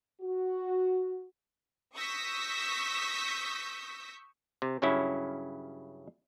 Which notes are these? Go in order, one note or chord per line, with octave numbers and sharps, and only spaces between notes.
F#4
C#6 D#6 E6 G6 A#6 B6
C3
G2 C#3 F#3 C#4 E4